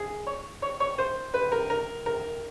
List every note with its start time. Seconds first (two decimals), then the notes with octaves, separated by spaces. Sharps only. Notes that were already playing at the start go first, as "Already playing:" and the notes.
Already playing: G#4
0.27 C#5
0.62 C#5
0.80 C#5
0.98 C5
1.34 B4
1.52 A#4
1.70 A#4
2.06 A#4